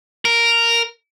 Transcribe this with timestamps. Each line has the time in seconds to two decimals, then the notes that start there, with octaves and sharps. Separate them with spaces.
0.25 A#4